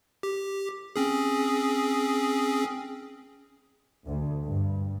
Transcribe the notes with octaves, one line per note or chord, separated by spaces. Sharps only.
G4
C4 C#4 G#4
D2
G2